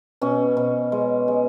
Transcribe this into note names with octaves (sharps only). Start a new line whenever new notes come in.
B2 C#4
B2
G#3
G#3